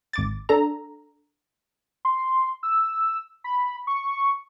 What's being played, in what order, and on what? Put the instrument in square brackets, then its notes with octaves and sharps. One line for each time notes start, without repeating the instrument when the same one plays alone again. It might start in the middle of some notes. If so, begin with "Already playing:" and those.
[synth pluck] G#1 D6 A6
D4 A4 A#5
[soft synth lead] C6
E6
B5
C#6